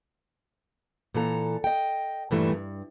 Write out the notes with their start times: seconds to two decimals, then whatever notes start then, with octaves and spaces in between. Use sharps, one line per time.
1.14 A#2 E3 A4 A#5
1.64 D#5 G5
2.31 G2 A#2 E3 G3 A3
2.53 G2